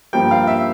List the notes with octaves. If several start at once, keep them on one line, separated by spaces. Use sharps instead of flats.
G2 F3 A#3 G5
F5
E5